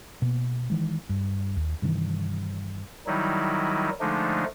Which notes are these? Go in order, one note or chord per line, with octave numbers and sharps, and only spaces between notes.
B2 A#3 B3
D#3 E3 G#3
G2
D#2
G2 C3 D#3 E3
D#3 F#3 G3 D#4 E4
D3 F3 G#3 A3 D4 D#4